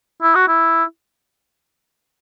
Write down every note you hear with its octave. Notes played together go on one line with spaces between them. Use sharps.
E4
F#4
E4